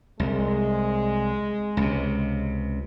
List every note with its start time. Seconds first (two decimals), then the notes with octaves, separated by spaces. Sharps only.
0.20 C2 G#3
1.77 C#2 C3